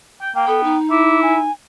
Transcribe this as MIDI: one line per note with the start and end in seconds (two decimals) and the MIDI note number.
0.21 0.30 79
0.35 0.44 58
0.35 0.78 79
0.47 0.74 59
0.47 0.63 69
0.64 1.47 63
0.91 1.37 64
0.91 1.20 86
1.23 1.52 80